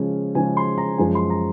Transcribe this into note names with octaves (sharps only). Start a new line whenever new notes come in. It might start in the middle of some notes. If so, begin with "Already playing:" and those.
Already playing: C#3 F3 G#3 C#4
C#3 F3 G#3 C#4 G#5
C6
A#5
F#2 F3 G#3 G#5
C6
A#5